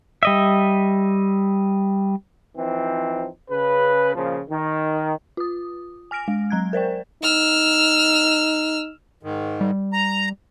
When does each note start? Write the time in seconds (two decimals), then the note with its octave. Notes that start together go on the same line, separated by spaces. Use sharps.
0.23 G3 D#5 E5
2.57 E3 F3 C4 D#4
3.50 C#3 B4
4.15 A#2 C#3 F3
4.50 D#3
5.37 F4 D#6
6.11 G#5 F6 A#6 D7
6.28 G#3
6.50 F#3 A#5 F#6 G#6
6.73 A#4 C5 D5 G5
7.23 D#4 E6 F6
9.23 G#2 D#3
9.61 G3
9.93 A#5